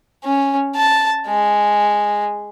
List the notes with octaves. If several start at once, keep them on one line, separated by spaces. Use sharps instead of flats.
C#4
A5
G#3